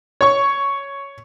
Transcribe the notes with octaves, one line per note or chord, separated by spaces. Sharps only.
C#5 C#6